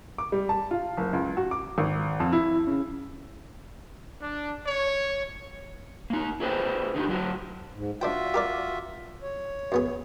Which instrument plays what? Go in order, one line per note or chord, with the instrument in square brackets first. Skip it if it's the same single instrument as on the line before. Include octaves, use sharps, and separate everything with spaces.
[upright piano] D6
G3
A5
F4
F#1
C#2
F#4
D6
G#1
F2
E4
C#3
[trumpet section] D4
C#5
[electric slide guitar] A#3 D#4
E4 G#4 B4 C5 G5
D3 D#4 E4 G4
F#3 E4 F#4
[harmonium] G#2
[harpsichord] D4 C5 G5 [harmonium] F4 F#4 E5
[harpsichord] G4 A#4 D5
[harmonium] C#5
[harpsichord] F#2 B3 G#4